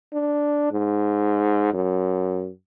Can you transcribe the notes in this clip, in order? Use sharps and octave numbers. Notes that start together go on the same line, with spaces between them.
D4
G#2
F#2